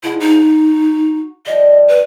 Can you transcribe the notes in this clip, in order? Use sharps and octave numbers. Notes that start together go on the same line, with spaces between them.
F3 G#3 E4 F#5
D#4
F#4
F3 G3 D#5
B4